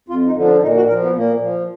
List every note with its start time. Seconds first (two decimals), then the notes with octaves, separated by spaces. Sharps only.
0.09 F2 F4
0.26 D#4
0.36 D3 F3
0.44 D4
0.62 A#2 D#4
0.76 F#4
0.89 F3 A#4
1.03 B3
1.16 A#2 A#3
1.42 F3